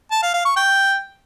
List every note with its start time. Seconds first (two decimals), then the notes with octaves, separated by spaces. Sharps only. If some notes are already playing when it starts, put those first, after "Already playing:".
0.12 A5
0.23 F5
0.34 F5
0.45 C#6
0.56 G5